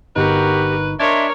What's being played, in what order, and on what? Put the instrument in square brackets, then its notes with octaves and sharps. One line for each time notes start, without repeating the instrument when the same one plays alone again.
[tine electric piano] G1 D#4 [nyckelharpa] F#4 A#4 [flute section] G4 [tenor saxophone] B4
[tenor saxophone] D4 [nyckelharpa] A#4 C#5 [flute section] D#5 E5 C6 [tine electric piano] G#6